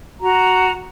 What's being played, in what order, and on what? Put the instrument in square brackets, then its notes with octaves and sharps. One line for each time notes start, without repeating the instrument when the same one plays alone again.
[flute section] F#4 A#5